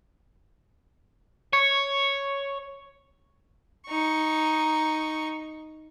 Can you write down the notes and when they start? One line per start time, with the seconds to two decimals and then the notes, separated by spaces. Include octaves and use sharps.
1.53 C#5 C#6
3.88 D#4 C#6